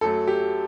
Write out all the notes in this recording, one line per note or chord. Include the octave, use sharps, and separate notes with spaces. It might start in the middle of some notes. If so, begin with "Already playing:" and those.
F#2 F#3 A3 A4
G4